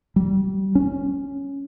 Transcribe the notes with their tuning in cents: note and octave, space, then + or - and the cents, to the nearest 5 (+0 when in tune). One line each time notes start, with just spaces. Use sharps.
G3 -30
C#4 +0